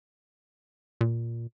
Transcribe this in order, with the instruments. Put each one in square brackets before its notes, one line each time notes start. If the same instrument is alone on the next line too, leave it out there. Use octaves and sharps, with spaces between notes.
[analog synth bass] A#2